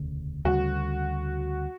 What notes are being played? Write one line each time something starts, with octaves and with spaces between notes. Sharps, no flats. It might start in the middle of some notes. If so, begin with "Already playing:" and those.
Already playing: E1 D2 C#3
D2 C#3 G3 F#4